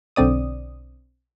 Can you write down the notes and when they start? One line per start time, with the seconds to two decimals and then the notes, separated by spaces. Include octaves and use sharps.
0.16 B1 D3 C4 D5 D#6